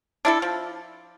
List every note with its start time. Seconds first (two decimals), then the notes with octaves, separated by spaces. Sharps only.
0.25 D4 E4 A4
0.42 F3